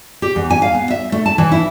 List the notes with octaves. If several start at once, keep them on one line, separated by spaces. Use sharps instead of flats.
G4
E2
G#5
F5
B3
E5
A3
A5
E3
E4